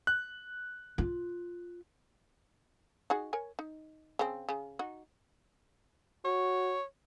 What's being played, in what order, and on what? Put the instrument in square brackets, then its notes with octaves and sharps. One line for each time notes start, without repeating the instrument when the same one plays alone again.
[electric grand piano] F#6
[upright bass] F4
[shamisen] D#4 F#4 G#4
A#4 C#5 G#5
D#4
C#3 C4
C#3
D#4 F#4
[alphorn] F#4 [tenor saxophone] C#5